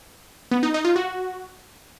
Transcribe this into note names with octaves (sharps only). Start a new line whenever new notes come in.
B3
D#4
D#4
F4
F#4